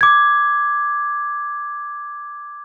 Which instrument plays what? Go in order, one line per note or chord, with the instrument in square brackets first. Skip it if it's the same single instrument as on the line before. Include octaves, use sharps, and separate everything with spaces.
[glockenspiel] D6 G#6